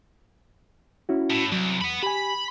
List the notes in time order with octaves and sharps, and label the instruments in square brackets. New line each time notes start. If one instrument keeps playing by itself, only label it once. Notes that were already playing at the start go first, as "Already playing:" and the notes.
[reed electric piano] C#4 E4 F#4
[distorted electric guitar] A2
[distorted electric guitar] C2 [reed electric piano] F#3
[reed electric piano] E2 [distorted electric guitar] F#5 B5
[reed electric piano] G4 G#5 [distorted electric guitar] B5